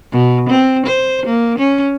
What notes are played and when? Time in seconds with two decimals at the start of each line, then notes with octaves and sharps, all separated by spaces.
0.13 B2
0.49 C4
0.86 C5
1.26 A#3
1.59 C#4